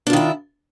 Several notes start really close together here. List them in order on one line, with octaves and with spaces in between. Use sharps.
D4 F4 D#3 E4